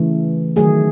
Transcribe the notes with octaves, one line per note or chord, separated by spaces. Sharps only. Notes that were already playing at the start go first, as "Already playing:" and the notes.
Already playing: C#3 E3 A3
D#3 F#3 A3 G#4